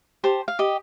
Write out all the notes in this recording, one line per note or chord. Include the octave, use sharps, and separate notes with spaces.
G4 C5 A5
F5
G4 D#5